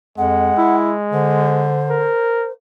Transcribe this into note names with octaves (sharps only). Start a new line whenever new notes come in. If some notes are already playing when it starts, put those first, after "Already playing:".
F2 G#3 F#5
E4
D3 C5
A#4